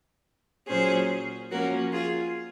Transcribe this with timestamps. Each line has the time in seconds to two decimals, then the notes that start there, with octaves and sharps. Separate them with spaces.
0.68 A#2 F#3 C#4 G#4 C5
1.51 F3 A#3 C#4 F#4 A#4
1.93 F4 G#4